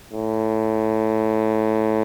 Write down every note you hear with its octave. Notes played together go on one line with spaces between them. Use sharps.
A2